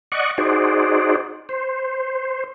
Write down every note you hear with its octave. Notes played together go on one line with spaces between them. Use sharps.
D5 D#5 F#5 C#6
D#4 F#4 G#4 C5 D5
C5